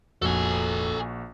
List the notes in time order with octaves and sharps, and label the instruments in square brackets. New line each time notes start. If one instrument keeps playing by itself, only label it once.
[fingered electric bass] F1 F2 [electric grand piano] A#1 F#4 [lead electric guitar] A4 G#5